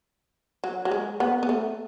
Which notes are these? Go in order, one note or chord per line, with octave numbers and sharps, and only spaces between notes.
F#3
F#3
G#3
B3
B3
A3